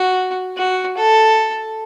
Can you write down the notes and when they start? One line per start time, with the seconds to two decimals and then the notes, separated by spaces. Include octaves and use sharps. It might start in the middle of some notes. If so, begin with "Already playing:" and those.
Already playing: F#4
0.57 F#4
0.97 A4